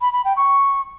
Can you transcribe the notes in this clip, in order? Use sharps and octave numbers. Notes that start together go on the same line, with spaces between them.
B5
B5
G5
C#6